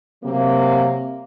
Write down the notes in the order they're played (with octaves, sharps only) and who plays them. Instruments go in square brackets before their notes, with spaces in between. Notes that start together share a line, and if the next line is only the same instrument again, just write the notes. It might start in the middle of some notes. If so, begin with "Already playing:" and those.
[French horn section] C3 F#3 A#3